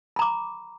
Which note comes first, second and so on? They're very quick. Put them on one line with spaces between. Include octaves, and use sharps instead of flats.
B5 A#5 D6